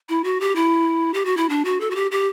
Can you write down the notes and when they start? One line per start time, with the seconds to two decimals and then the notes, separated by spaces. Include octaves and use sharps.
0.09 E4
0.24 F#4
0.40 G4
0.55 E4
1.14 G4
1.25 F#4
1.37 E4
1.49 D4
1.65 F#4
1.80 A4
1.91 F#4
1.95 G4
2.11 G4